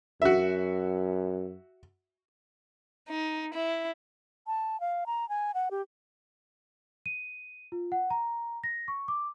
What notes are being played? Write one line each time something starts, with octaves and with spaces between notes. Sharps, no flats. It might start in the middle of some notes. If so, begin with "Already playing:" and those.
F#2 F#4 E5
D#4
E4
A5
F5
A#5
G#5
F#5
G4
D#7
F4
F#5
A#5
A#6
C#6
D6